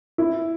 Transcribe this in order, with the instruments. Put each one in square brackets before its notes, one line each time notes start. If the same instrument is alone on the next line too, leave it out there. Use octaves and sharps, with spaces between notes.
[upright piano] E4